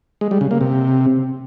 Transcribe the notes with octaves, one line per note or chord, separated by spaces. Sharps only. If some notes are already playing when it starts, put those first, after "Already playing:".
G#3
G3
C#3
A#3
C3